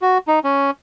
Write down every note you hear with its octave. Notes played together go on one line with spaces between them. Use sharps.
F#4
D#4
C#4